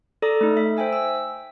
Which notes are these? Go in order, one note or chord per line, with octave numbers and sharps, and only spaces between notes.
A4 D5 A#5 D6 D#6
A3 D#4
E5
C5 E5 G5 G#5 E6
E6